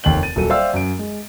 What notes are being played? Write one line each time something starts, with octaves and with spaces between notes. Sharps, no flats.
F1 D#2 G5 F#7
A6 D#7
D#1 F#3 A4 D#7
C5 D5 E5 F5 G5 E6
F#2 D7
G#3